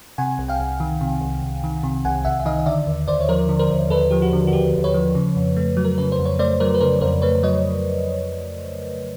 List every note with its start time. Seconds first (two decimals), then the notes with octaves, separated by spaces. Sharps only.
0.18 C3 F#5 G#5
0.39 C2
0.48 F5 G5
0.60 C2
0.80 D#3
1.01 C3
1.21 C2
1.42 C2
1.64 D#3
1.83 C3
2.05 C2 F#5 G#5
2.25 C2 E5 F#5
2.40 E5
2.46 D#3 D#5 F5
2.59 D#5
2.66 D3 D5 E5
2.87 D#2
3.08 D#2 C5 D5
3.21 C#5
3.29 F3 A#4 C5
3.49 D3
3.59 A#4 C5
3.70 D#2
3.90 D#2 A4 B4
4.11 F3 G4
4.22 F#4
4.33 D3
4.47 F#4
4.53 D#2 G4
4.74 D#2
4.84 B4 C#5
4.94 F3
5.15 C#3
5.36 F2
5.57 A3
5.77 F#3
5.84 A#4
5.98 C#3 B4
6.12 C5
6.19 F2
6.25 C#5
6.39 A3 C5 D5
6.60 F#3 A#4 C5
6.75 B4
6.80 C#3 A#4 C5
7.01 F2 A#4 C5
7.22 A3 B4 C#5
7.43 F#3 C#5 D#5